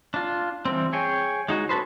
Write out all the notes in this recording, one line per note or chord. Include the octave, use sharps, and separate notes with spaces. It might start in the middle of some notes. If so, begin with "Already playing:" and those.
D4 F4
E3 G3 C4
G#4 C#5 G5 G#5
G#3 D#4 F#4
C#4 F#4 A4 B4 C5